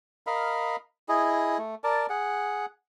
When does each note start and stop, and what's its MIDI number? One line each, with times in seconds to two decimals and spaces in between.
0.27 0.76 70
0.27 0.76 75
0.27 0.76 77
0.27 0.76 83
1.09 1.58 64
1.09 1.58 68
1.09 1.58 75
1.58 1.75 57
1.84 2.06 70
1.84 2.06 74
1.84 2.06 81
2.09 2.66 68
2.09 2.66 78